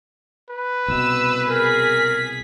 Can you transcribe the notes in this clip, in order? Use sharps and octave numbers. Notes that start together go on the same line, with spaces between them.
B4
C2 B2 E6
G#4 A#4 B6